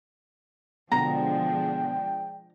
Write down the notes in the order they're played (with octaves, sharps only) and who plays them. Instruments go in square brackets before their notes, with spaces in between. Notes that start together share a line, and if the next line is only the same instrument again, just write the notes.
[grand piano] B2 D3 A#6 [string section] F3 G#3 D4 [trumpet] G5 [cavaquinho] A#5